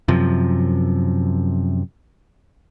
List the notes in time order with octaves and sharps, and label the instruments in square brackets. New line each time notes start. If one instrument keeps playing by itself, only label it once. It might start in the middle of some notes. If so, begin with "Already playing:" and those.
[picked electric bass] F#2 C3 F3